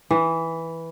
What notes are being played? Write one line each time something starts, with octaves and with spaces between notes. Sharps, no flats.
E3